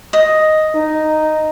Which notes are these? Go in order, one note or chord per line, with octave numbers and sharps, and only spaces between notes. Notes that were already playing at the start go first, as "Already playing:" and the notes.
D#5
D#4